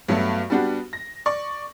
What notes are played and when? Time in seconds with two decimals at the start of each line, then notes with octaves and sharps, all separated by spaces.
0.08 G2 F#3 A3 B3
0.50 G3 B3 D4 F#4 G4
0.93 A#6
1.26 D5 C#6